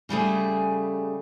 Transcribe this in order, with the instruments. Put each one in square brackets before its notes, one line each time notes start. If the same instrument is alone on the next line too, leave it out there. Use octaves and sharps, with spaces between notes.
[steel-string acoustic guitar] C#3 G3 A3 G#4